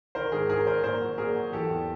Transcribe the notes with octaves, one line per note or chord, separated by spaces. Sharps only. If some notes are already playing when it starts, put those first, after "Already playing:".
D#3 A#4 C5
G#2 G#4 A#4
D#3 G#4 A#4
D#3 A#4 C5
A#2 A#4 C5
F#3
A#2 G#4 A#4
F#3
E3 G4 A4
E2